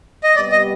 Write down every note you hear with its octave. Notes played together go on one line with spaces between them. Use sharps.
D#5
C3 G3 B3 D5
D#5